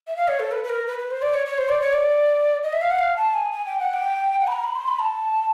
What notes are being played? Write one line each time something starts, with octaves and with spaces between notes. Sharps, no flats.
E5
F5
C#5
A4
B4
B4
A#4
B4
B4
C5
D5
C#5
C#5
C5
D5
C#5
D5
D#5
E5
F5
F#5
F5
A5
G#5
G#5
G5
F#5
G5
F#5
B5
A#5
B5
C6
B5
A5